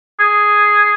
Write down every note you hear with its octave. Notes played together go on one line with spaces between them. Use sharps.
G#4